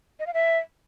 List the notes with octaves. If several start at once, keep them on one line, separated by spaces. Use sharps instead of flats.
D#5
F5
E5